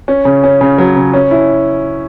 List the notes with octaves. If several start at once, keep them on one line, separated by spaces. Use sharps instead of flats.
C#4
C#3
C#4
C#3
F#3
C#3
C#4
E4